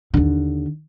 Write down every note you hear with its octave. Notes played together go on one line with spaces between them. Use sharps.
D#2 D3